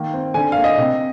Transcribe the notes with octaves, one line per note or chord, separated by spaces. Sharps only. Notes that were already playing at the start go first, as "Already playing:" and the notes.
Already playing: D#3 A#3
C4
D3 G#5
A#3 F5
D#5
C3